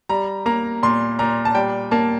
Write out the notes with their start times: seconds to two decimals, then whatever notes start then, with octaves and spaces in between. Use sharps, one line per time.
0.09 G3 A#5
0.46 A#3 A#5
0.83 A#2 C6
1.19 A#2 A#5
1.45 A5
1.55 G3 G5
1.91 A#3 A5